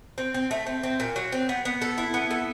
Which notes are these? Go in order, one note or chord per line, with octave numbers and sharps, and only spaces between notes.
C4
C4
A3
C4
C4
A#2
F#3
C4
B3
B3
A4
E4
B3
A4